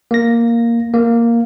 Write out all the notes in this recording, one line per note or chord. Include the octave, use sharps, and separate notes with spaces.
A#3 A#6
A#3